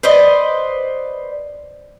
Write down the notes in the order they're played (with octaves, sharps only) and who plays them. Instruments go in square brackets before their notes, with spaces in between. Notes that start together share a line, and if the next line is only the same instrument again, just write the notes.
[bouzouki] B4 C5 D5 D#5